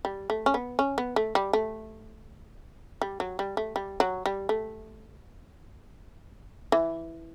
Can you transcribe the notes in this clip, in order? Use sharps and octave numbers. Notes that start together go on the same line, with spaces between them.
G3
A3
C#4
B3
C#4
B3
A3
G3
A3
G3
F#3
G3
A3
G3
F#3
G3
A3
E3